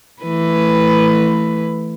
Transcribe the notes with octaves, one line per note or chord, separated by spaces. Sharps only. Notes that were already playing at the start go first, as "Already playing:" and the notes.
E3 A3 B4